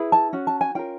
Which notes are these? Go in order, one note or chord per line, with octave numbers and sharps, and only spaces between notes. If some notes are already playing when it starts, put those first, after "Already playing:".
Already playing: E4 G#4 B4
A5
C#4 F#4
A5
G#5
C#4 F4 A#4 G5